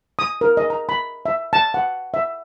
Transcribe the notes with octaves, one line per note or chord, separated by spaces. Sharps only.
D#6
A#4
D#5
A#5
B5
E5
A5
F#5
E5